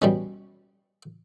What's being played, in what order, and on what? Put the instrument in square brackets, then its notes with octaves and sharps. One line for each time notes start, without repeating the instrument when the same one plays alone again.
[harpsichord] B2 G3 C#4